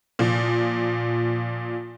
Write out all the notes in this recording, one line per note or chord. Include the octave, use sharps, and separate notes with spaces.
A#2 F3